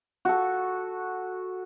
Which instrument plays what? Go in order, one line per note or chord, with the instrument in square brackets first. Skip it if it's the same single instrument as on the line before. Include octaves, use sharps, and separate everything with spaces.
[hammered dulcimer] F#4 A4